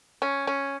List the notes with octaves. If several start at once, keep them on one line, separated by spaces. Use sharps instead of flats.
C#4
C#4